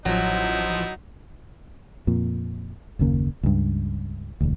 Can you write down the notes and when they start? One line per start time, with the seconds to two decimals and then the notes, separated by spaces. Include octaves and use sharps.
0.05 A1 F3 F#3 D#4 E4
2.07 F2 A#2
2.99 F#1 D#2 C#3 A#3
3.43 C#2 G2
4.41 E1 D2